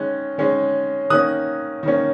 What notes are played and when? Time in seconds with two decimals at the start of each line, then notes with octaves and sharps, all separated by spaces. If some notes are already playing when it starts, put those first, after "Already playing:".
Already playing: D#3 G#3 C#4 F#6
0.38 D#3 G#3 C#4
1.10 D#3 A#3 C#4 D#6 F#6
1.83 D#3 A#3 C#4